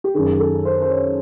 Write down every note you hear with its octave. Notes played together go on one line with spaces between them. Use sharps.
G4
F#2 D#3 G#4
A4
C5
C5
C#5